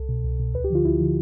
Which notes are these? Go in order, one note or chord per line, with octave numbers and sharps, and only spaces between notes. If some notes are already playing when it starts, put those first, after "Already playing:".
Already playing: C2 A4
B2
C2
B2
D2 B4
G4
D3 F3 F4
D2 E4
D3 F3